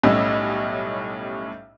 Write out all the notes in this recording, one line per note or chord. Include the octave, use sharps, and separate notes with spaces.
B1 A2 G3 C#4 D#5 E6